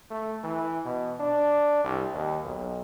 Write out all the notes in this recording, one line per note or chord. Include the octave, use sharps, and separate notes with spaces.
A3
E3
B2
D4
C2
D#2
B1